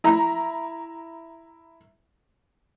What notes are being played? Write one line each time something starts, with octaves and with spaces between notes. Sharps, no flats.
E4 A#5